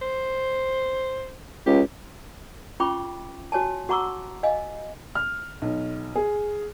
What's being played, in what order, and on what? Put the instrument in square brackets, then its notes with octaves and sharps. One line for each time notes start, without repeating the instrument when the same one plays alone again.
[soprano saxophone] C5
[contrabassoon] C#2 [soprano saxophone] G4
[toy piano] C#4 F4 G5 B5 C#6 D6
F#4 C#5 G#5 A5
F#4 F#5 A#5 C#6 D6 E6
D#5 F5 G#5
[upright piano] F6
B1
G#4